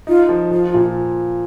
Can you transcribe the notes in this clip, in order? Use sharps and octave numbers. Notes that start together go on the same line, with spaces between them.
D#4 F4
F3
F3 F4
A#2